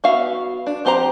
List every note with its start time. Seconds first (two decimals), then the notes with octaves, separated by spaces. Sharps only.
0.04 B3 F#4 E5 F5
0.66 D4
0.85 F3 C4 G4 C5 A#5